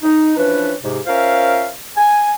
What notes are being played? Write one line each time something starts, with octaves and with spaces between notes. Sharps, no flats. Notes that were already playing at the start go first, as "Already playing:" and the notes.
D#4
E3 F3 C#4 D4 B4
G#2 C3
C#4 F4 A#4 C5 E5 F5
G#5